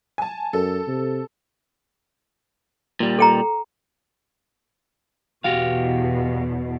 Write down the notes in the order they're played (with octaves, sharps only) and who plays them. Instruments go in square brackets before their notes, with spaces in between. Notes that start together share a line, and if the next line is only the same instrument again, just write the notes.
[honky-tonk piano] G#5 A5
[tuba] F#2 [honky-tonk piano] A4
[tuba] C3
[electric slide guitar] A#2 G3
[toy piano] A4 G5 A#5
[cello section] E2 B2 [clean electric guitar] F#4 G4 F5